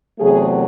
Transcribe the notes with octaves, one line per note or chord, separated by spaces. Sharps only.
E2 C3 F#3 A3 G#4